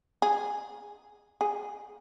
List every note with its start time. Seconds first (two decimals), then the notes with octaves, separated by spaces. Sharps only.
0.22 G#4
1.41 G#4